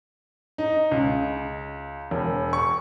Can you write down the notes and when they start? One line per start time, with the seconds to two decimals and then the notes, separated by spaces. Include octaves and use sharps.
0.58 D#4
0.91 C#2
2.11 E1
2.53 C#6